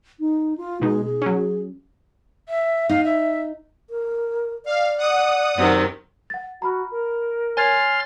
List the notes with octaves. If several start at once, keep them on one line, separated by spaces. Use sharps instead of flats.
D#4
F4
B2 G#3 D#4
G#4
F#3 C#4
E5
D#4 F5
E5
A#4
D5 F5
F#5 D#6
F#2 C3 D#3
F#5 A6
F#4 A#5 B5 F6
A#4
C#5 G#5 C6 F6 G#6 A6